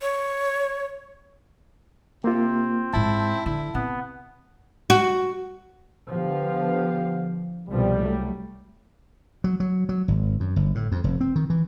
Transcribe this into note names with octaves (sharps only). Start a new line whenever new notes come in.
C#5
C3 A#3 C4 F4
G#2 G#3 E4 A5
D3 E4
C3 B3
F#4
D3 F3 B3 G4 F5
C2 B2 F3 G3
F#3 A3
F#3
F#3
F#3
G#1
F#2
G1
A2
F2
F1
C4
D#3
E3